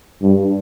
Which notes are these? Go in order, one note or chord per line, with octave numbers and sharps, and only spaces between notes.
G2